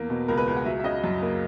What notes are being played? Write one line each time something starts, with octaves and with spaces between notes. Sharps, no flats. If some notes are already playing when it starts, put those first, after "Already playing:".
Already playing: E2 A#3
B2
C#2 A#4
B4
C#2
F#5
F#3 E5
E5
C#3 D#5
F#2
A#3